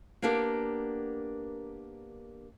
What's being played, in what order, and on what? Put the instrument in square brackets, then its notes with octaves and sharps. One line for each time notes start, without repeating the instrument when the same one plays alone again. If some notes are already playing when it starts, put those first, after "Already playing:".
[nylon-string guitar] A#3 B3 D4 G4 A#4